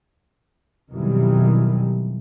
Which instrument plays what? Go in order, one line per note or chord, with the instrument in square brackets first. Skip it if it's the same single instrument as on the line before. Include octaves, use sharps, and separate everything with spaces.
[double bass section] B1 F2 D#3 E3 F#3 G3